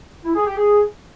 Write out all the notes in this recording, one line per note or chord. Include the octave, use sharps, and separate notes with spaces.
E4
G#4
G4
G#4